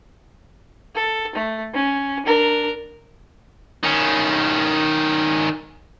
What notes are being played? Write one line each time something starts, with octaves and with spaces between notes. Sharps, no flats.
A4
A3
C#4
D4 A#4
D#3 C#4